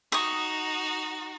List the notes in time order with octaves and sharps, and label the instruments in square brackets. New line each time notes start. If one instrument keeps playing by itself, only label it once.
[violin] D#4 F#4 [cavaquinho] C#6 D#6